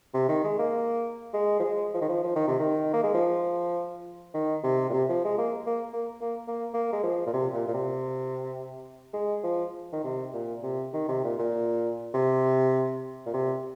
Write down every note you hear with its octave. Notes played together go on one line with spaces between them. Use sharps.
C3
D#3
G#3
A#3
G#3
F3
G#3
F3
D#3
F3
F3
D#3
C3
D#3
A#3
G#3
F3
D#3
C3
A#2
C3
F3
G#3
A#3
A#3
A#3
A#3
A#3
A#3
G#3
F3
A#2
C3
A#2
A#2
C3
G#3
F3
D#3
C3
A#2
C3
D#3
C3
A#2
A#2
C3
A#2
C3